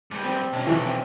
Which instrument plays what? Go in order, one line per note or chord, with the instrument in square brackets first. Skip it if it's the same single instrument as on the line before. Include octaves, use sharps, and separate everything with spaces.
[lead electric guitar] G#2 G3
[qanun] C4
[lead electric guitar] B2 [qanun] C#4 D4 A#5
[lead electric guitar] B1 [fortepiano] E3 [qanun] A#4
[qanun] C4